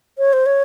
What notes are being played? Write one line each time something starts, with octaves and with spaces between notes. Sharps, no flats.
C#5
C5
C#5